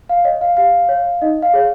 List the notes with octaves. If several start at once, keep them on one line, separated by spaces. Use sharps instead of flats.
F5
C#5 D#5
F5
G4 F5
C#5
D#4 D#5
F5
G#4 C#5